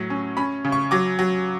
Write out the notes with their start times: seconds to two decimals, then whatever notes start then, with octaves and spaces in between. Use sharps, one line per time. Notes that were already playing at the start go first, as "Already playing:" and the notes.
Already playing: A2 F#3
0.10 C#4
0.37 C#4 B5
0.65 C#3
0.72 C#6
0.91 F#3 D6
1.19 F#3